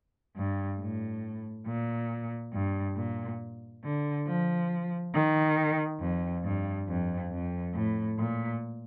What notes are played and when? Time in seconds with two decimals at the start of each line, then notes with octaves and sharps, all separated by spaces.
0.36 G2
0.79 A2
1.67 A#2
2.53 G2
2.96 A#2
3.84 D3
4.27 F3
5.14 D#3
6.00 F2
6.44 G2
6.88 F2
7.31 F2
7.74 A2
8.18 A#2